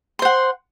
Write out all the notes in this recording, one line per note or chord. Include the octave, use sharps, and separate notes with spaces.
C5 F#5 C6